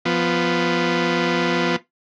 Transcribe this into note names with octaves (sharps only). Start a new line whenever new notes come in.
F3 B3